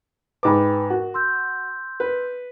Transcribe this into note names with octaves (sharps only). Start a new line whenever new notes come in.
G#2 B4 G5 B5 D6
F#4 A#4
C6 E6 G6
B4